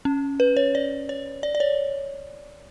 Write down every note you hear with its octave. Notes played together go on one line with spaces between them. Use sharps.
C#4
B4
C#5
D5
C#5
D5
D5
C#5